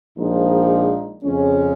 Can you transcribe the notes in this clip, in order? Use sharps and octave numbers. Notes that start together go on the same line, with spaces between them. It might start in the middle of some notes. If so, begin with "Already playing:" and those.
A#1 A#2 F3 G#3 D#4
F2 C#3 G#3 C#4